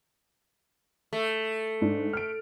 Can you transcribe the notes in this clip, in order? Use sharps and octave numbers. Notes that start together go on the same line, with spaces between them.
A3
G#2 D4
F6 D7